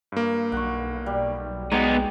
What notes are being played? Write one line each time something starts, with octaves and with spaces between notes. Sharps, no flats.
G2 A#3
B1 F#5 C#6
G3
G#3 B3 D#4 G5 D6